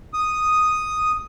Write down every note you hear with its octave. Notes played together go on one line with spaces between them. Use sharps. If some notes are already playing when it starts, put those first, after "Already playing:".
D#6